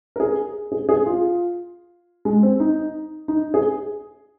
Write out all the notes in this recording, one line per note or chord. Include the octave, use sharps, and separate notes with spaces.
A#4
G#4
G#4
G#4
F4
G#3
C4
D#4
D#4
G#4